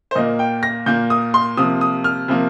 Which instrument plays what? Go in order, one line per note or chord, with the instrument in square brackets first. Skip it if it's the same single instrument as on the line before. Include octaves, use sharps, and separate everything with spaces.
[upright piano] C5
A#2 A#3 D#5
G5
A#6
A#2 A#3 G6
D#6
C6
C3 F3 A#3 D#6
D#6
F6
C3 F3 A#3